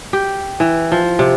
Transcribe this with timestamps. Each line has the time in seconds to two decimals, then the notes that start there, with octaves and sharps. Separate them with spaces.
0.13 G4
0.60 E3
0.92 F3
1.19 C3